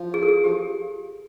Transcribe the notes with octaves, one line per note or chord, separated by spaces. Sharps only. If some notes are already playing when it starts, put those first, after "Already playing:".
Already playing: F3
G#4
A4
G#4
F3 G4